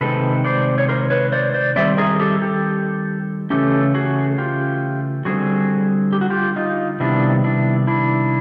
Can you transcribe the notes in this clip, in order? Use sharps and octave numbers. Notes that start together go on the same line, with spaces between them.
C3 D#3 G#3 C4 A4 B4
C5 D5
C#5
A#4 C5
B4 C#5
C5 D5
C5 D5
D#3 G3 C4 D5 E5
G#4 A#4
G4 A4
G4 A4
C#3 E3 A3 C#4 G4 A4
F#4 G#4
F4 G4
D3 G3 C4 F#4 G#4
G4
F#4
F4 G4
D#4 F4
C3 D#3 G3 B3 D4 E4
D4 E4
D4 E4